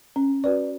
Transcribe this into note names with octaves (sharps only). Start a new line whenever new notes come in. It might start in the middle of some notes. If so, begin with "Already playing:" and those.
C#4
F#4 B4 D5